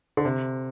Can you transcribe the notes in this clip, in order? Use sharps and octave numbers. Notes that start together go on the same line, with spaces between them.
D3
C3